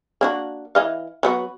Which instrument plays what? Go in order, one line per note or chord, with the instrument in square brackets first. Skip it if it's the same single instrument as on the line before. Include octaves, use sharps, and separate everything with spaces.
[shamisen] A#3 D4 F#4
E3 D#5 F5
F#3 B3 F#4